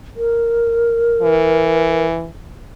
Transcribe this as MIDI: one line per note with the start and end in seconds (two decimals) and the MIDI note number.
0.16 2.07 70
1.22 2.27 52